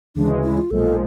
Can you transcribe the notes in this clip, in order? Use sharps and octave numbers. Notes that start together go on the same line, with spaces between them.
D2 C#3 E3 G#3 D4
E4
F4
B1 A#2 F3 G#3 A4